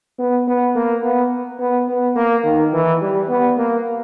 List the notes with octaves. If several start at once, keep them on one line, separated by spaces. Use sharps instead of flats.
B3
B3
A#3
B3
B3
B3
A#3
D#3
E3
G3
B3
A#3